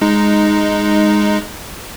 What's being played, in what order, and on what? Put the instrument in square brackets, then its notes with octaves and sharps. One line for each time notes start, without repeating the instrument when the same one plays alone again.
[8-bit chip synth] G#3 D#4